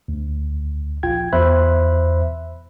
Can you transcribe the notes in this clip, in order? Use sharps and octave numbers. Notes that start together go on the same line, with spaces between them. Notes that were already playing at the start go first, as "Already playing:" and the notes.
D2
A#1 F4 G5 G#6
E2 C5 E5 B5 C6 F#6